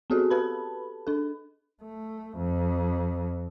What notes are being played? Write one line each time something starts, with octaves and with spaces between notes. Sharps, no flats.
B3 C4 F#4 G#4 A4
G4 A4 B4 A5 B5
D4 A4
A3
F2